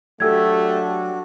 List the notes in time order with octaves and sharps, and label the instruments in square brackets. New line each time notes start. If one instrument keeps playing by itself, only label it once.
[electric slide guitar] F#3 G4 [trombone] A3 [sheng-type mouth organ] D4 F#4 [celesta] A4 E6 G#6